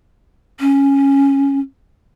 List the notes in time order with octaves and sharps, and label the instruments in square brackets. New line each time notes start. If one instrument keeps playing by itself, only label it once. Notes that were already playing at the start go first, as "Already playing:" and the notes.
[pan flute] C#4